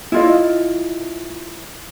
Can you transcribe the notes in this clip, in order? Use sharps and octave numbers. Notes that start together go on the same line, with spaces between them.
E4 F4 D#5